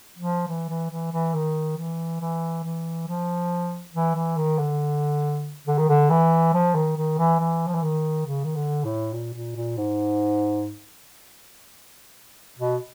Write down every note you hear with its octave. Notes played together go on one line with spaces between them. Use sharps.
F3
E3
E3
E3
E3
D#3
E3
E3
E3
F3
E3
E3
D#3
D3
D3
D#3
D3
E3
F3
D#3
D#3
E3
E3
F3
E3
D#3
C#3
D#3
D3
A2
A#2
A#2
A#2
G#2
B2